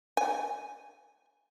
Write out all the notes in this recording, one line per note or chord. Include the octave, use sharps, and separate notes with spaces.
G#5